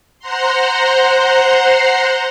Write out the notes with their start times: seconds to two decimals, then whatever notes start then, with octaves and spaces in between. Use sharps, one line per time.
0.19 C5 F#5 A#5 C6